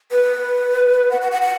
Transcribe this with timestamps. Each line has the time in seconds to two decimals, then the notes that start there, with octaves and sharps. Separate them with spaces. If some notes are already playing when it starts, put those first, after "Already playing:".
0.11 B4
1.11 F#5
1.21 F#5
1.32 F#5
1.42 F#5